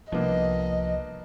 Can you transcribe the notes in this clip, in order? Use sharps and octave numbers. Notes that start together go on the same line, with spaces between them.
C2 F3 A#3 B3 D4 D#5